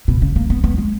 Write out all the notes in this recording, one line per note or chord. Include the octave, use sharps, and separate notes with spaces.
B2
C#3
A#3
B3
B3
G#3